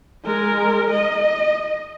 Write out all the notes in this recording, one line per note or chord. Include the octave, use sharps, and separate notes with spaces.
G#3 A#4
D#5